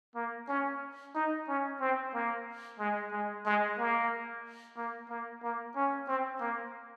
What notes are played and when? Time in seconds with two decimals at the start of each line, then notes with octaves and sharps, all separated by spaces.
0.15 A#3
0.49 C#4
1.15 D#4
1.48 C#4
1.81 C4
2.14 A#3
2.79 G#3
3.12 G#3
3.46 G#3
3.78 A#3
4.77 A#3
5.09 A#3
5.43 A#3
5.76 C#4
6.08 C4
6.41 A#3